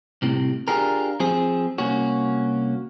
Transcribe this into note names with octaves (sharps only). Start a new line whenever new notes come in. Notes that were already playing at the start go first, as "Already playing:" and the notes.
C2 A2 C3
D4 F4 G4 G#4 A#4
F3 C4 G#4
C2 A#3 C#4 F#4